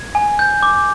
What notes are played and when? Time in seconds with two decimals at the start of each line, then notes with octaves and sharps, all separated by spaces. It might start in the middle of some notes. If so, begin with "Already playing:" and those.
Already playing: G#6
0.15 G#5
0.39 G6
0.63 D6